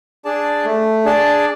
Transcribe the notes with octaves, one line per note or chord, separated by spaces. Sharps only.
D4 G#4 D5 A5
A3
D4 G#4 D5 A5